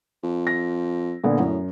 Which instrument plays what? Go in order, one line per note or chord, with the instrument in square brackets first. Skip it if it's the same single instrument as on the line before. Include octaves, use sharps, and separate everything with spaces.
[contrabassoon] F2
[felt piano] A#6
A#2 D3 B3
[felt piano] F#2 [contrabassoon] A2